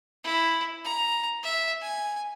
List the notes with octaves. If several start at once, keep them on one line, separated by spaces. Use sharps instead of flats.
E4
A#5
E5
G#5